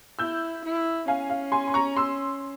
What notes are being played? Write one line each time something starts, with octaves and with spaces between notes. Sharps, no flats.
E4 E6 G6
E4
C#4 F5 G#5
F5
G#5 C6
C6
A#5 C#6
C6 E6